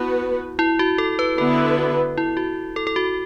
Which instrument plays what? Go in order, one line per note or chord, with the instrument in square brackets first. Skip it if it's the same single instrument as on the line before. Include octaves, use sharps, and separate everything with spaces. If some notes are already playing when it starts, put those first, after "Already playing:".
Already playing: [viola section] B3 F#4 B4 [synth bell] E4
[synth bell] E4
F#4
A4
B4
[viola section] D3 B3 E4 B4 [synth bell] A4
[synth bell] F#4
E4
F#4
A4
A4
F#4